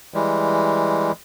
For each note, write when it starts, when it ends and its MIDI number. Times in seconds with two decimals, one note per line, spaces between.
0.14 1.12 52
0.14 1.12 55
0.14 1.12 56